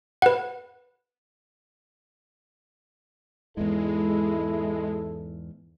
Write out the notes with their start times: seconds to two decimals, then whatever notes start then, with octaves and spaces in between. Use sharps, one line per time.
0.22 B4 F#5
3.57 E2 G#2 G#3 E4 A4